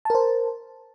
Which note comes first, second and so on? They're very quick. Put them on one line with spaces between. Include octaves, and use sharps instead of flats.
A5 A#4 C5